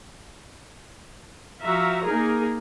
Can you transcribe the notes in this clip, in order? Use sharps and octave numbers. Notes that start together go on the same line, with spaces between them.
F3 F#4 E5 F5 A#5
A#3 D#4 G#4 A#4